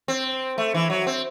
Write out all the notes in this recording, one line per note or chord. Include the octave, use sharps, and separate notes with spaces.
C4
A3
E3
F#3
C4